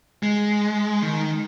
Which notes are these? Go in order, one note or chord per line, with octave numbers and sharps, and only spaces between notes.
G#3
D#3